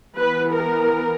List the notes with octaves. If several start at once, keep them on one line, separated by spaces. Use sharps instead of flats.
E3 B3 B4
A#4